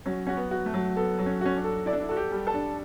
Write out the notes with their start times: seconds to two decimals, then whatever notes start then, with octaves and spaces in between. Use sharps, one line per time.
0.06 F#3 C#4
0.27 C#4 F#4
0.37 B3
0.51 F#4
0.66 A3
0.74 F#3
0.96 B3 A4
1.19 F#3
1.26 C#4
1.41 C#4 F#4
1.56 D4
1.64 A4
1.86 E4 D5
1.93 D4
2.01 E4
2.09 F#4 A4
2.17 G4
2.32 G3
2.47 A4
2.54 D4